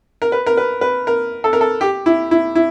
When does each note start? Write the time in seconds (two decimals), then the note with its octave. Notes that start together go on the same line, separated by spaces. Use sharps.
0.22 A#4
0.32 B4
0.46 A#4
0.57 B4
0.81 B4
1.07 A#4
1.44 A4
1.53 A#4
1.61 A4
1.81 G4
2.06 E4
2.31 E4
2.55 E4